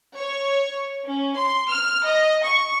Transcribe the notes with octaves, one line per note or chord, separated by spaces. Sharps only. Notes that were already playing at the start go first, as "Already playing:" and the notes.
C#5
C#4
C6
F6
D#5
C#6